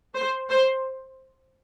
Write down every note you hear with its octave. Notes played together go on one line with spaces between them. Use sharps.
C5
C5